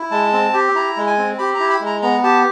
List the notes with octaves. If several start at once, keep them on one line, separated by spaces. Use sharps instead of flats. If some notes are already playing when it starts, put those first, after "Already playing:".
Already playing: E4
G#3 A5
C4
G4
E4 A#5
G#3
G#5
C4
G4 B5
A#5
E4
B5
G#3
A#5
B3 A#5
G4 A5